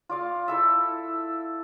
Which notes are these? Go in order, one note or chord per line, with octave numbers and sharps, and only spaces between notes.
F4 D5 F5
E4 A4 E5